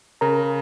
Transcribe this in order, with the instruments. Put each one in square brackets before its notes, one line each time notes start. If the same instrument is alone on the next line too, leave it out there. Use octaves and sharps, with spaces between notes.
[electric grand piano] C#3 [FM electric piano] A#4 A#5